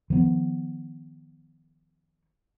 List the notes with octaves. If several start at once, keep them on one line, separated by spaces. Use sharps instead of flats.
D#3 F3 A#3 B3